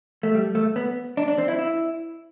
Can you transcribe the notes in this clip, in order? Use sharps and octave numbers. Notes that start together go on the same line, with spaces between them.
A3
G3
A3
B3
D4
D4
C4
E4
E4